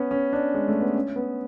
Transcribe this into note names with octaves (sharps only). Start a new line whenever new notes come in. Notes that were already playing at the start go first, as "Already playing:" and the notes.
Already playing: B3 C#4
C#4
D4
G#3
A3
B3
C#4
B3